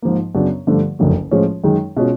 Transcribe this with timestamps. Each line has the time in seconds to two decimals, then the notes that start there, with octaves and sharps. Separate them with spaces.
0.02 G#2 F3 A#3
0.34 F#2 C#3 F#3 B3 D4
0.67 G2 D3 F3 A3
0.99 F#1 F2 D3 F#3 A3
1.31 A2 F3 G#3 C#4 F4
1.64 F#2 D#3 G#3
1.97 B2 G#3 C#4 F4